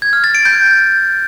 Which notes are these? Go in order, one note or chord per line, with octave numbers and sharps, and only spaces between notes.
G#6
F6
A6
D7
G6